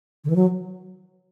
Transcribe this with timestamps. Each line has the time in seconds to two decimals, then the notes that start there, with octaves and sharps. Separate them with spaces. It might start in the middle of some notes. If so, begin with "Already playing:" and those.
0.24 D3
0.30 E3
0.36 F#3